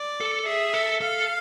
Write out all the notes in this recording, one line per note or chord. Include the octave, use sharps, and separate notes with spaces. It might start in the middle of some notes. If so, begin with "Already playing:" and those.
Already playing: D5
A4
G#4 E5
A4
A4 F5